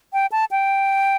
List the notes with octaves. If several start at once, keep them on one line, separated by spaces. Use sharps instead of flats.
G5
A5
G5